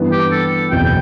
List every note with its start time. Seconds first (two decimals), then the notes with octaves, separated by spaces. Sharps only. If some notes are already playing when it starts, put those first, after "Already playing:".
Already playing: G2 E3 B3
0.12 G4
0.32 A4
0.72 F#1 E2 B2 G5